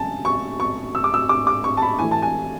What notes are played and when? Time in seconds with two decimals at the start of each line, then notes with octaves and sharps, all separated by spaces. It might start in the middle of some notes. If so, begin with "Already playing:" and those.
Already playing: C#3 F#3 G#5 A5
0.25 C#6
0.60 C#6
0.95 E6
1.04 D6
1.14 E6
1.29 D6
1.47 D6
1.64 C#6
1.77 A5
1.82 B5
1.99 A2 E3 A3 G#5
2.11 A5
2.22 G#5